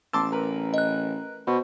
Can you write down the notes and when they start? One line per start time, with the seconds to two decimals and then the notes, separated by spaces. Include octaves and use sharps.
0.13 A1 A5 C6 D6 E6
0.32 A#4 B4
0.74 D#5 F#6
1.47 B2 C5